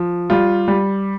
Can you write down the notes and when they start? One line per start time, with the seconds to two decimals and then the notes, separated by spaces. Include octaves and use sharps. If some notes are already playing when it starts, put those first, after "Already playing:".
Already playing: F3
0.30 G3 F4
0.68 G3